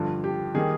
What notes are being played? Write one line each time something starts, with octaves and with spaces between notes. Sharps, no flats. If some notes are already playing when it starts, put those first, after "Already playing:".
Already playing: G2 D3 F3
G4
D#3 G3 A#3 D#4 G#4